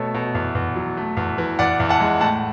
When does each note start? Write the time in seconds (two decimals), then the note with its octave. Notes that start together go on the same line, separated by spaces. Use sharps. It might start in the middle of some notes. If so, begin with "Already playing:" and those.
Already playing: B2 A3 A4 C#5
0.14 B2
0.35 E2
0.55 E2
0.76 F#3
0.97 A3
1.17 E2
1.38 E3
1.59 E2 D5 F#5
1.80 E2
1.89 F#5 A5
2.00 G#3
2.21 A2 F#5 A5